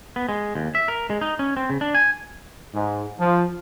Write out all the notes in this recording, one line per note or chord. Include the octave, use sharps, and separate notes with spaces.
B3
G#3
D#2
E5
A#4
G#3
D#4
C#4
C4
C#3
D4
G#5
G#2
F3